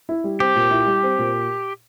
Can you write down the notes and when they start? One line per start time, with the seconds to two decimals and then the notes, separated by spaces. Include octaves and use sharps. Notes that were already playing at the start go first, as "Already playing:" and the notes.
0.09 E4
0.24 G3
0.40 C4 G4
0.56 A#2
0.71 E4
0.86 G3
1.03 C4
1.19 A#2